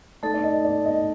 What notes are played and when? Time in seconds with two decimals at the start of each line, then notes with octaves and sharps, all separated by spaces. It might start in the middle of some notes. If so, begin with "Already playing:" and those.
0.23 A3 D#4 A4 D5
0.34 D5
0.44 D#5
0.65 D5
0.85 D#5